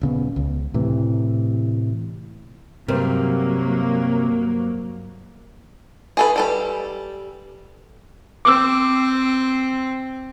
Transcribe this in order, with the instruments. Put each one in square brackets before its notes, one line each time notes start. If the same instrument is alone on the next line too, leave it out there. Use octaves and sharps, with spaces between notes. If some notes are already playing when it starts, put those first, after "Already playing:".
[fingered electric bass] D#1 C#3 B3
C#2
A2 C3 E3
[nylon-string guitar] G2 [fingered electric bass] C3 [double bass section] F#3 A#3 [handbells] A#4 C5
[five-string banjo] G#4 A4 B4
G3 A4 B4
[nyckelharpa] C4 [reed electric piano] D6 E6